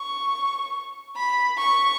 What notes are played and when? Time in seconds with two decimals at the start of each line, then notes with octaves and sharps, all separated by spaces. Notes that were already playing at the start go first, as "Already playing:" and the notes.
Already playing: C#6
1.16 B5
1.57 C#6